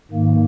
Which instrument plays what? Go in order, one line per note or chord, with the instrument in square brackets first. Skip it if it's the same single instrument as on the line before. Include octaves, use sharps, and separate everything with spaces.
[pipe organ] G#2 D#3 A#3